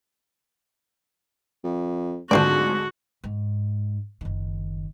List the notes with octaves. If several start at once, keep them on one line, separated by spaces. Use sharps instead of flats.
F2
D1 G#2 D3 F3 D4 F#4 D5
G#2
F#1 D#3